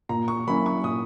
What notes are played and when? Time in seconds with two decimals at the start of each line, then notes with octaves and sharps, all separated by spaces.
0.09 A#2 A#5
0.28 C#6
0.47 F#3 A#3 C#4 E4 B5
0.66 C#6
0.84 A#2 D#6